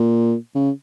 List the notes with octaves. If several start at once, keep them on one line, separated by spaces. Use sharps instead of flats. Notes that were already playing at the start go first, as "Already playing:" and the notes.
Already playing: A#2
C#3